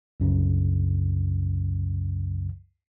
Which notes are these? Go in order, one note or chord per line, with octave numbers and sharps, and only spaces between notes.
C2 F#2 C#3